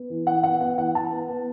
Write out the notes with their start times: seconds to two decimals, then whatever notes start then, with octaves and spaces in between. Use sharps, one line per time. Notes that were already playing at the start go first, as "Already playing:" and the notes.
Already playing: B3
0.10 E3
0.27 E3 F#5
0.43 B3 F#5
0.60 B3 F#5
0.78 E3 F#5
0.94 E3 A5
1.11 B3
1.28 B3